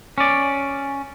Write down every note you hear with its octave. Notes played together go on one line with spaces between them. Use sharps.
C#4 D5